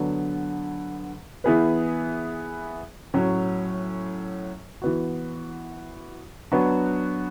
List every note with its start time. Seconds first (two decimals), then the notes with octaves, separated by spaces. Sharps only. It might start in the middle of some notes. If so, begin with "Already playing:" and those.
Already playing: D3 F#3 B3
1.44 E3 B3 E4 G#4 B4
3.14 A2 F#3 C#4
4.82 E3 B3 F#4
6.52 F#3 B3 D4 F#4